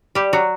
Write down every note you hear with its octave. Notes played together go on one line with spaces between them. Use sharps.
G3 G4
F#3 F#4